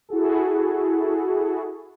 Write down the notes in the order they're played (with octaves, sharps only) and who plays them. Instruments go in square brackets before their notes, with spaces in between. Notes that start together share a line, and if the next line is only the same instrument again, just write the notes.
[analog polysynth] E4 F#4 G#4 A4